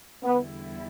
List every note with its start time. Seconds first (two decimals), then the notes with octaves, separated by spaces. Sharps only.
0.24 E2 D3 G3 B3 E4